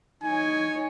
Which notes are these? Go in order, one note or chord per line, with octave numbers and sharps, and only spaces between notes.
D#4 C#5 G#5